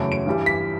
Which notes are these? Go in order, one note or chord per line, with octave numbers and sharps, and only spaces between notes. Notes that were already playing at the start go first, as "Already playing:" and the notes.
Already playing: F#1 E2 C#3 F#3 A3 D7
D7
G2 E3 G3
B6